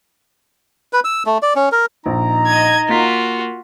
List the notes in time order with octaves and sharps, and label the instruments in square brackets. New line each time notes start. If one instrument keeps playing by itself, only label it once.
[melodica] B4
E6
A3
D5
C#4
A#4
[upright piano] A#1 [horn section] D#4 A#5
[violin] D#5 G#6
[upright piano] A#3 B6 [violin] F4 F#4